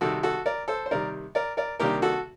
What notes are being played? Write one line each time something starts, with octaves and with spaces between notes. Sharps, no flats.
C3 D#3 G3 F#4 A4
F#4 A4
A#4 D5
A4 C5
C5
C3 D#3 G3 A#4 D5
A#4 D5
A#4 D5
C3 D#3 G3 A#3 D4 G4 A#4
F#4 A4